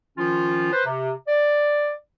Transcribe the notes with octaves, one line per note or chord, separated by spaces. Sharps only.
D#3 F3 C#4 F4
B4 C5
C3
D5